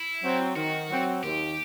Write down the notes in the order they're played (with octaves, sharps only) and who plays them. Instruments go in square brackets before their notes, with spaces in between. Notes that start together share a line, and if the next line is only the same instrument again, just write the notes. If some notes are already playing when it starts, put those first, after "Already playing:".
Already playing: [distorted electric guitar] E4
[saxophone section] F#3 C4
[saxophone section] D#3 [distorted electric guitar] F#4
[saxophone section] F#3 C4
[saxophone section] D#2 [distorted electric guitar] G4